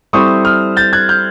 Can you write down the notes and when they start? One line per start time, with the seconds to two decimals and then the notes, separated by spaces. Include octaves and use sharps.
0.13 G3 C4 E4 A4 C5 C#6 D#6
0.44 D#6 F6
0.77 G6 A6
0.93 F#6 G#6
1.09 F6 G6